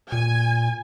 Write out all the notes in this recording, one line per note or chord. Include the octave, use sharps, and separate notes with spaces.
A#2 G#5